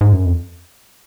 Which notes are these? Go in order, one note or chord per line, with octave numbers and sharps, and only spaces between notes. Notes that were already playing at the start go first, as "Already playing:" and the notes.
G#2
F#2
F2